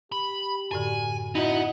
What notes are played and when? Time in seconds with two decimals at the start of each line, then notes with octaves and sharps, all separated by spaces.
0.12 G4 B5
0.71 F#2 A2 D3 G#5
1.35 B3 D#4 E4 F#4 D#5 F#5